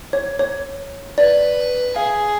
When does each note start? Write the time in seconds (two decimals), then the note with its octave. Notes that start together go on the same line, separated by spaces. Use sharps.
0.13 C#5
0.39 C#5
1.18 B4 D5
1.96 G#4 F5